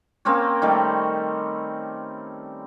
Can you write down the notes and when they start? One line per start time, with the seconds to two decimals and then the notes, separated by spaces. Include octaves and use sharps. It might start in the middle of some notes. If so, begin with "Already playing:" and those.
0.25 A#3 C4 C#4 C#5
0.62 D#3 G3 A3